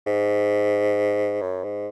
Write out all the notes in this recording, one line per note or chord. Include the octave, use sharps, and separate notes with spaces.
G#2
F#2
G#2